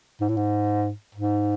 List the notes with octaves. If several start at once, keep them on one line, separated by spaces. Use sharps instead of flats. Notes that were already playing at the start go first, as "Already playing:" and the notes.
G#2
A2
G#2
G#2